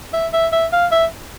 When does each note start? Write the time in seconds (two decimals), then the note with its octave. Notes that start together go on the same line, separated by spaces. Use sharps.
0.13 E5
0.33 E5
0.52 E5
0.73 F5
0.91 E5